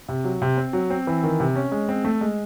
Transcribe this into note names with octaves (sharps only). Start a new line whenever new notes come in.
C3
F#3
C3
C4
F#3
C4
E3
D#3
C3
C#4
G#3
C4
A3
G#3